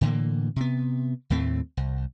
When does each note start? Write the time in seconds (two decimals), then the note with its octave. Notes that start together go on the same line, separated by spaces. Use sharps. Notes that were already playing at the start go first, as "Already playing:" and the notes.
0.01 A2 D3 E3 A#3
0.56 C3 B3
1.30 D#2 A2 A3 C4
1.77 C2